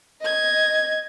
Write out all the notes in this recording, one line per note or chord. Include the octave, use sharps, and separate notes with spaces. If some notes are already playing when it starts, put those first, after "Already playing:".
D#5 G#6